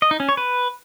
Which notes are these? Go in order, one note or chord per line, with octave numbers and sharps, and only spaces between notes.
D#5
D#4
C#4
C#5
B4